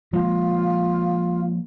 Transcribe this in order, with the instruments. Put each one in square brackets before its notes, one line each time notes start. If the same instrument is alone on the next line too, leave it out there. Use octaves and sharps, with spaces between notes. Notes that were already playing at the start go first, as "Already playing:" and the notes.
[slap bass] F3 G#3 A#3 [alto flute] F4